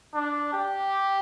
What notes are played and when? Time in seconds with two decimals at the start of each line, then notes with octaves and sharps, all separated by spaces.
0.15 D4
0.54 G4